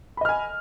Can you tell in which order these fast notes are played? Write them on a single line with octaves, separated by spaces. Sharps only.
B5 D#5 F6 G#5